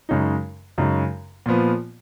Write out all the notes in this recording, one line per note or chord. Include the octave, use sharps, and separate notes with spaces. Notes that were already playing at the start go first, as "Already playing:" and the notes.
F#2 C#3 G#3 D#4
F#2 C#3 G#3 D#4
A#2 F3 B3